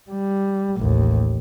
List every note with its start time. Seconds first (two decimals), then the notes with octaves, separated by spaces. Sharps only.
0.11 G3
0.77 A1 D#2